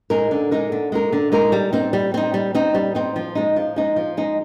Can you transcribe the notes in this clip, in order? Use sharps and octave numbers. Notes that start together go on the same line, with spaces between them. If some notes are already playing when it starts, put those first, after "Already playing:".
G#3 D#4 A#4
D3
G#3 D#4 A#4
D3
G#3 D#4 A#4
D3
G#3 D#4 A#4
G3
C4 D#4
G3
C4 D#4
G3
C4 D#4
G3
C4 D#4
F3
G#3 D#4
F3
G#3 D#4
F3
G#3 D#4